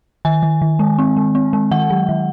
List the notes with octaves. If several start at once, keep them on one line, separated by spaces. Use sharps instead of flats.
D#3 G#5
D#3
D#3
G#3
C4
G#3
C4
G#3
D#3 F#5
F#3
D#3